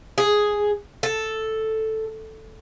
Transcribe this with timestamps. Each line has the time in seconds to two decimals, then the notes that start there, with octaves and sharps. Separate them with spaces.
0.18 G#4
1.03 A4